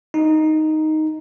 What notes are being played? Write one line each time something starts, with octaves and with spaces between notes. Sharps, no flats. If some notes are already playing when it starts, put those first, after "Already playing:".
D#4